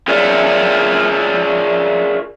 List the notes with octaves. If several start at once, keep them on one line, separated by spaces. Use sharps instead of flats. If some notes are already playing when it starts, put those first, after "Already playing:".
F4 G#4 A#4 C#5 D5 E5